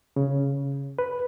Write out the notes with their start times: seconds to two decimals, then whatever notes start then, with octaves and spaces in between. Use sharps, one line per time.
0.16 C#3
0.99 B4